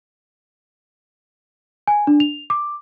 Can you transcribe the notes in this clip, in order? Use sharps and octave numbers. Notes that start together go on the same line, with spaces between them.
G#5
D4
F7
D6